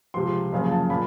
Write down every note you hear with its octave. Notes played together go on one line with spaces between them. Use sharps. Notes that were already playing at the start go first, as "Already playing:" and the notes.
C#2 C3 F3 C6
F#1 F#2 C#3 F3
A5
A#2 F3 A#3 B5